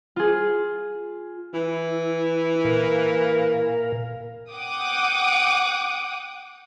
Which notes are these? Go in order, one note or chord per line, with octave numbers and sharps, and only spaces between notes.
F4 G#4
E3 E4
A#2 A#4 F5
F#5 G5 D6 D#6